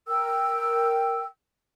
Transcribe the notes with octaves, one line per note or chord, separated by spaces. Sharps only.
A#4 G5 E6